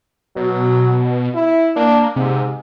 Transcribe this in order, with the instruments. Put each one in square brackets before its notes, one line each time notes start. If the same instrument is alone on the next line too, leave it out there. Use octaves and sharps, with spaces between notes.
[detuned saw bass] B2 [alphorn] F#3
[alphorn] E4
[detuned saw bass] A#3 [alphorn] D4
[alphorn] G#2 [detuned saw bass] C3